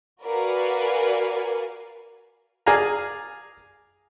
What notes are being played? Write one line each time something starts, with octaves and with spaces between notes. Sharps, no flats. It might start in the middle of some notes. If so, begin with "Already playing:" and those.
F#4 A#4 B4 D5 F5 G#5
G#4 D5 F5 G#5 A#5